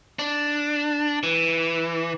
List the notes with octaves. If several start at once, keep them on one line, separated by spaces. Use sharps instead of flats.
D4
E3